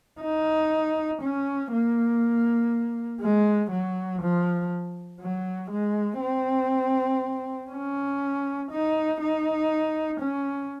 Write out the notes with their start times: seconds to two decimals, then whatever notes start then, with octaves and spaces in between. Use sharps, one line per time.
0.21 D#4
1.22 C#4
1.72 A#3
3.21 G#3
3.71 F#3
4.22 F3
5.20 F#3
5.71 G#3
6.20 C4
7.70 C#4
8.71 D#4
9.21 D#4
10.20 C#4